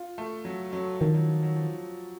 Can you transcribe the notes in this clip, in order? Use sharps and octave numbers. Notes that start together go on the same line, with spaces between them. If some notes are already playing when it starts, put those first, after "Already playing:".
Already playing: F4
A3
F#3
F#3
D#3 F3
F#3
F3
F#3
F3